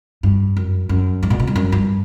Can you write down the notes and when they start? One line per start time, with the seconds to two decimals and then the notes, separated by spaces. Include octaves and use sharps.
0.23 G2
0.57 F#2
0.89 F#2
1.23 G2
1.30 A#2
1.40 B2
1.47 G2
1.56 F#2
1.72 G2